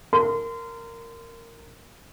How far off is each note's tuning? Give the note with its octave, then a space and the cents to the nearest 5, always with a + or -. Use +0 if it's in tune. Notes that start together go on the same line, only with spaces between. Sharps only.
A#4 -15 C6 -30